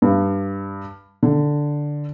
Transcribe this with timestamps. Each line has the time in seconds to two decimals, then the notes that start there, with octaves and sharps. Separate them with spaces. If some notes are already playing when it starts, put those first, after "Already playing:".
0.02 G2
1.23 D3